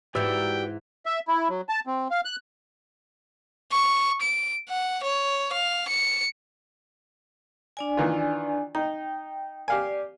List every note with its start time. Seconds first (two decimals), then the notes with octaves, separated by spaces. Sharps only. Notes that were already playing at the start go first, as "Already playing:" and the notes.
0.15 G#2 E3 F#4 G4 B4 D5 G5 E6
1.06 E5
1.28 E4
1.49 F#3
1.69 A5
1.87 C4
2.11 F5
2.25 F#6
3.72 C#6
4.22 D7
4.69 F#5
5.03 C#5
5.52 F5
5.88 C#7
7.77 D4 D5 G#5
7.97 D#3 E3 F4
8.75 D#4 G5
9.68 G4 D5 F5 G#5